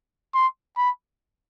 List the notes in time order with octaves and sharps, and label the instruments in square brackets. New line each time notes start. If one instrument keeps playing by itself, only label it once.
[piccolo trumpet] C6
B5